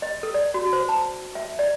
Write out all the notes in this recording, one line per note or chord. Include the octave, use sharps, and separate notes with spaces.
D#5
A4
D5
F#4
C5
A5
E5
D5